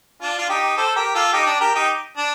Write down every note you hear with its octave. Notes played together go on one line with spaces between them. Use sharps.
D4 F4
F4
D#4 G4
A4 C5
G4 A#4
F4 A4
D#4 G4
D4
G4 A#4
D#4 G4
D4